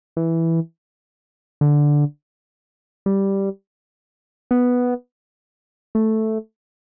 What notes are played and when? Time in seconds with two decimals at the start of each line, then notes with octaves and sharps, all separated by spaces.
0.17 E3
1.61 D3
3.06 G3
4.51 B3
5.95 A3